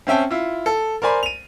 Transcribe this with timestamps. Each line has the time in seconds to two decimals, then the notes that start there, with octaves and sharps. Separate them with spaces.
0.07 C4 C#4 E5 G5 A5
0.31 E4 F4
0.66 A4
1.02 A#4 C5 D5 G#5 B5 C6
1.23 D#7 F7